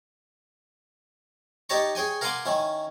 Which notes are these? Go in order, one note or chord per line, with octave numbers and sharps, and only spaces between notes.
D#4 G4 C#5 A5 A#5 C#6
G#4 C#5 G5 G#5
A#4 F5 F#5 G#5 C6 D6
D#3 C#4 E4